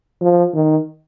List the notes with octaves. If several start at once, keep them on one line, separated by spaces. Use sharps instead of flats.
F3
D#3